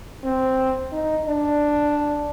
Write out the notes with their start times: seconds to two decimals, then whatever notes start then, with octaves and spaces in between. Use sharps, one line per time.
0.24 C4
0.92 D#4
1.26 D4